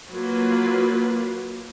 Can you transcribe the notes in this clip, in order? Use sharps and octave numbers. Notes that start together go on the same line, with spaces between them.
F#3 A#3 F4 B4